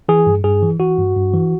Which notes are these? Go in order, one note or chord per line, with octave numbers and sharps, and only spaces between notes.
E3 G#4
G2
G2 G#4
E3
E3 F#4
G2
G2
E3